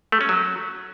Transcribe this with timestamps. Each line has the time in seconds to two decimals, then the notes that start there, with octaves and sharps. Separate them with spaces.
0.12 A3
0.21 C#4
0.29 F#3